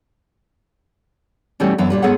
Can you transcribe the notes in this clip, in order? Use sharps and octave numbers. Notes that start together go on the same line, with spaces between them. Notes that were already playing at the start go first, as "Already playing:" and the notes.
B2 E3 G3 A3 C#4
F#2 E3 B3 E4
A#2 G3 B4
G#2 B3 G#4 A4 C#5 F#5